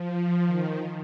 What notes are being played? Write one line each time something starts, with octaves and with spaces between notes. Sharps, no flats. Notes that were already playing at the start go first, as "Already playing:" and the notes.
Already playing: F3
D#3